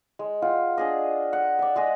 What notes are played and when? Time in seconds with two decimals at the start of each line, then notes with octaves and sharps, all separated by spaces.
0.19 G#3
0.42 F4 F#5 G5
0.78 D4 G#4 D#5
1.33 F#5
1.59 D5 E5
1.76 G#3 G#4 D#5